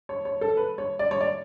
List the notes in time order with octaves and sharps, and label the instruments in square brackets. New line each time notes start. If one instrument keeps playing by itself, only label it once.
[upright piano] C#5
C#5
A4
B4
C#5
D5
C#5
D5